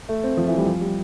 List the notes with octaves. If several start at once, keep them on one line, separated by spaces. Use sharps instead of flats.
A3
C4
F3
E3
G3
F3
G3